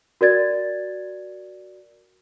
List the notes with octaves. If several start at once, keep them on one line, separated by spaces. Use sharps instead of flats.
F#4 A#4 D5 G#6 A6